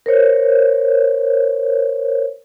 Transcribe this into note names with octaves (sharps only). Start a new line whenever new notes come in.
A#4 C5 C#5